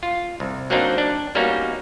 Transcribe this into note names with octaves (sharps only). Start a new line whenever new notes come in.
F4
C2
F#3 A#3 C4 D4 D#4
D4
G3 A#3 B3 C#4 D#4 F#4